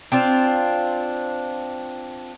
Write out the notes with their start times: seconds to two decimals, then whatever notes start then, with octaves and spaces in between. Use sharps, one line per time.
0.12 C4 D4 F4